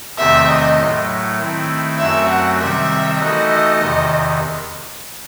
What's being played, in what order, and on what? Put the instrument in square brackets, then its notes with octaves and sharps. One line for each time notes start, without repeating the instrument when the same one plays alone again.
[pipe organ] E2 C3 D#3 A3 C4 [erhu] E5
[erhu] D#5
[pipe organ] A2 F#3 A3
D#3 A3 C4 E4
[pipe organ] F#2 F#3 A3 C4 F#4 [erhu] E5
[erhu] F#5
[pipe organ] C3 D#3 G3 C4 [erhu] E5
[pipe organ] E3 A3 D#4 F#4 A4 [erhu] D#5
[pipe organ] E2 C3 D#3